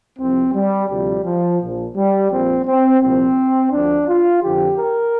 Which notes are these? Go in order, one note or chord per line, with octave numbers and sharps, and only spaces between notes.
C2 C3 F3 C4
G3
D2 C3 F3 G3
F3
A#1 A#2 F3
G3
A#1 A#2 F3 C4
C4
C2 A#2 F3 C4
D2 D3 F3 D4
F4
F2 D3 F3 G4
A#4